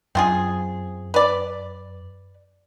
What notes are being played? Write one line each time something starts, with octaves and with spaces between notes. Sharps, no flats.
F#2 C4 F4 G#4
B4 D5